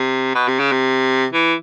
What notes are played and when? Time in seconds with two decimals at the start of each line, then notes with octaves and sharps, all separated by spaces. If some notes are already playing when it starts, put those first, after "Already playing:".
Already playing: C3
0.35 B2
0.48 C3
0.59 C#3
0.72 C3
1.32 E3